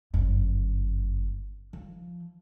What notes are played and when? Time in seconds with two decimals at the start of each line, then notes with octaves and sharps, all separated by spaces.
0.14 G1 F#2
1.73 F3